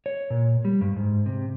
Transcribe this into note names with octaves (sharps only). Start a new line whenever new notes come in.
C#5
A#2
G3
G2
G#2
C3